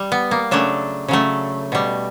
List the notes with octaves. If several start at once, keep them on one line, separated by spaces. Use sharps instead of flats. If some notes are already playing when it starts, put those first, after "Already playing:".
Already playing: G3
B3
A#3
C#3 F#3 A3 D4
C#3 F#3 A3
B2 G3